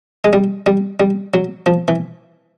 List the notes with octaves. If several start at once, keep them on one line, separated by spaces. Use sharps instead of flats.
G#3
G3
G3
G3
F#3
F3
E3